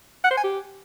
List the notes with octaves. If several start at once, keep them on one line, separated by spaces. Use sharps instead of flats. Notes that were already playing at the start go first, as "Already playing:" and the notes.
F#5
C5
G#5
G4